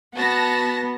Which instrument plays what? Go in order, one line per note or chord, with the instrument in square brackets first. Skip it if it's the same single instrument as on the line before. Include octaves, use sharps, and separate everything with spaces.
[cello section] B3 [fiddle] F#4 [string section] A5 A#6